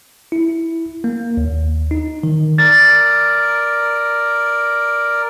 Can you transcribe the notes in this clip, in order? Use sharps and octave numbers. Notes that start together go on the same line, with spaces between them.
E4
A#3
D#2
D#4
D#3
A#4 D5 A6